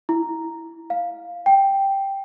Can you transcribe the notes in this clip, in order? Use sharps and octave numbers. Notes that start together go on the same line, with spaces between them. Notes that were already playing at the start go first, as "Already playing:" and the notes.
E4
F5
G5